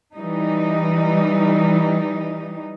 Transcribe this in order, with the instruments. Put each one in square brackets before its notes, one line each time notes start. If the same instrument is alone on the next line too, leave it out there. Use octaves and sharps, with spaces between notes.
[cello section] E3 G3 D#4